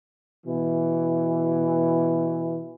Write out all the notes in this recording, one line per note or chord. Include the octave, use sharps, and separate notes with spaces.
B2 E3